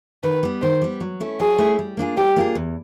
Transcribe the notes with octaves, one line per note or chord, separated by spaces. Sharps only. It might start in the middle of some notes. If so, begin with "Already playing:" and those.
D#3 B4
G3 B3
D#3 C5
G3 B3
F#3
A3 C#4 E4
F#3 G#4
A3 C#4 E4
G3
A#3 D4 F4 G#4
G3 G4
A#3 D4 F4 G#4
E2